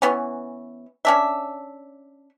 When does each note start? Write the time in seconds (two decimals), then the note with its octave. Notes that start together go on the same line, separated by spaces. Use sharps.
0.02 E3 B3 C#4
1.05 C#4 D4 E5